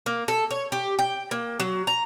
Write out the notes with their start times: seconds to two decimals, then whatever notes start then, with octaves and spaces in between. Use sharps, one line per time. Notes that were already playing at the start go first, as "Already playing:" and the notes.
0.06 A#3
0.28 A4
0.51 C#5
0.72 G4
0.99 G5
1.31 A#3
1.60 F#3
1.87 A#5